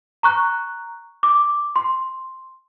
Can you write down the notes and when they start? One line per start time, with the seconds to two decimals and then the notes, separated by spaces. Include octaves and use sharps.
0.23 A#5 C#6 F#6
1.23 D6
1.76 C6